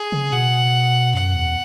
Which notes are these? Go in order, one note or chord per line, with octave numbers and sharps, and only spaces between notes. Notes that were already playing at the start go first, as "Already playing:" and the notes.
Already playing: G#4
C#3
B2 F#5
F#2 F#5
E2